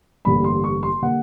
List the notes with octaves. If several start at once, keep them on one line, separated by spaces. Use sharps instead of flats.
A1 G2 D3 G3 A#3 B5
C6
C#6
C6
D3 G3 A#3 F#5